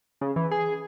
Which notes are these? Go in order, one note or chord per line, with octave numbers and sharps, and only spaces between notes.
C#3
E3
G#4